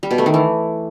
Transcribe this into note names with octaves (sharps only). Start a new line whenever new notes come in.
G3
B2
A3
D#3
E3